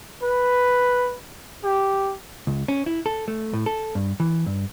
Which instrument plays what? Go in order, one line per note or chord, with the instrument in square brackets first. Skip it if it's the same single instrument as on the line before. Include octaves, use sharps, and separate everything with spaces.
[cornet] B4
G4
[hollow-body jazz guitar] C#2
C#4
E4
A4
A3
A2
A4
G2
E3
G2